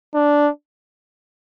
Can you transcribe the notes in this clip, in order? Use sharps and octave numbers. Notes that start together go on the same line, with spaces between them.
D4